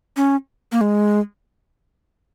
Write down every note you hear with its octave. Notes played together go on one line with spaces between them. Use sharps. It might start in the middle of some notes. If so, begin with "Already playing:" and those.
C#4
A#3
G#3